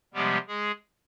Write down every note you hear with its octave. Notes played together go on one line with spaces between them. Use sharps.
C3 F3 G3 G#3 B3 G4
G#3 G#4